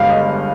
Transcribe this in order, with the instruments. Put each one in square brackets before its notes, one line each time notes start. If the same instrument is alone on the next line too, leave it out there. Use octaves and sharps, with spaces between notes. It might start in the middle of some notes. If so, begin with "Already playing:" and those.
Already playing: [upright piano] G1 G2 G#3 F5
D#5